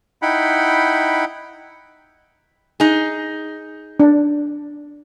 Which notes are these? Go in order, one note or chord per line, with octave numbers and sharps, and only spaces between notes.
D#4 E4 F#5 G5 B5
D#4 G#4
D4